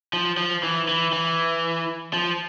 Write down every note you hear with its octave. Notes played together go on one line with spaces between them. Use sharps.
F3
F3
E3
E3
E3
F3